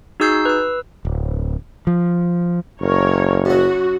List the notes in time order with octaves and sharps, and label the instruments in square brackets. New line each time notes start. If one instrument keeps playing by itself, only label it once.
[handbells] D#4 F#4 G#4 E6 G6 C7
B4 E6
[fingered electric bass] D1
F3
[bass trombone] F#1 [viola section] A#4 C#5
[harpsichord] F#2 F#3 [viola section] F#4